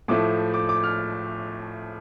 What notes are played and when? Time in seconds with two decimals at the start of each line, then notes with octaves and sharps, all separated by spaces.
0.08 A2 F3 A3 D6
0.54 D6
0.69 D6
0.84 F6